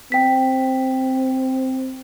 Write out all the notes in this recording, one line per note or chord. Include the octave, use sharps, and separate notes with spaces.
C4 G5 B6